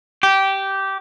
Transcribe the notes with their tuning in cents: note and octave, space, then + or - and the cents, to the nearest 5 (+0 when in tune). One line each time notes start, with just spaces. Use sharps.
G4 -15